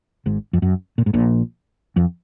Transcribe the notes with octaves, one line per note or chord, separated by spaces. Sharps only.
G#1 G#2
F2
F#2
A#2
G#2
A#1 A#2
F2